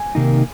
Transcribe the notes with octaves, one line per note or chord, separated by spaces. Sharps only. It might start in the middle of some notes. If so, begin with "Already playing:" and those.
Already playing: G#5
C3 D#3 A#3 D#4